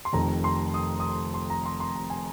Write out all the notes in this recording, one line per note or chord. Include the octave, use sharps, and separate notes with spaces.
C6
F1 F2 D#3 A#5
C6
D#6
D#6
C6
A#5
C6
C6
A#5
G#5